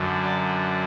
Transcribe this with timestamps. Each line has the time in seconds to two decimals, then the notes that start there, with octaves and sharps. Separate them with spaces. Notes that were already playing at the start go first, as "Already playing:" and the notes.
Already playing: F#2 D3 F#3
0.22 D5